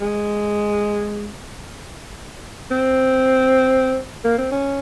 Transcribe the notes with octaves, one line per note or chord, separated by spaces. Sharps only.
G#3
C4
A#3
C4
C#4